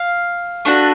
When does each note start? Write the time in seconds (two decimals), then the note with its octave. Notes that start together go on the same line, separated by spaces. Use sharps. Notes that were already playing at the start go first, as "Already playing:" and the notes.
Already playing: F5
0.65 A3 D4 F#4